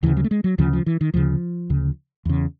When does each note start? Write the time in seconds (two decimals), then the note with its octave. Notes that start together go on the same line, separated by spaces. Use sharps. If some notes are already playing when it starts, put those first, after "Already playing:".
0.03 D2 C#3 E3
0.17 F#3
0.24 A3
0.31 G#3
0.44 F#3
0.58 D2 C#3 F3
0.73 F3
0.86 E3
1.01 D#3
1.14 D2 C#3 F3
1.70 D2 C#3
2.25 E2 C#3